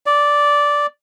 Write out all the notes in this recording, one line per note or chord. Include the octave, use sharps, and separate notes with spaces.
D5